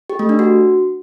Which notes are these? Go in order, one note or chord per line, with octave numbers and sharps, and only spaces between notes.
G4
A3
D4
F#4